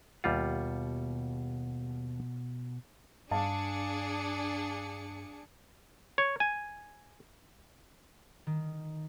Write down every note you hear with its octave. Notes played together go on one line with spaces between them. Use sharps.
D#2 B2 G3 F4 F#5
G2 D4 G#4 F5 A5 C#7
C#5
G#5
D#3